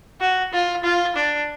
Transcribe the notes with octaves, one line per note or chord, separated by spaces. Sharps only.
F#4
F4
F4
D4